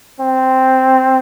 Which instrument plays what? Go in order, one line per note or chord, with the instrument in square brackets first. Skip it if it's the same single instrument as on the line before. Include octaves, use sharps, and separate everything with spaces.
[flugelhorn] C4